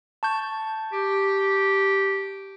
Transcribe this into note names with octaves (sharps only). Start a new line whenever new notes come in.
A5 C#6 G6
G4